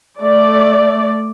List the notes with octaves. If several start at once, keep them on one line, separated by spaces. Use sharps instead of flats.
A3 D5